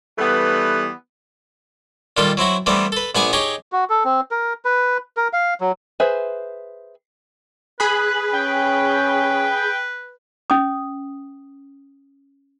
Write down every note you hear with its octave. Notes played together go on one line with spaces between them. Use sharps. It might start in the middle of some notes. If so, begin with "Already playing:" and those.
E3 G3 A3 B3
A#2 D#3 G3 F4 A4
F#3 C4 E4 F#4
E3 G3 A3 B3 C4 D4
A4 B4
A#1 B3 G#4 F#5 G#5 D6
D#4 G4 G#4 C#5
F#4
A4
C4
A#4
B4
A#4
F5
F#3
G#4 B4 C5 E5
G#4 B4 B5 F#6
C#4 G5
C#4 D#6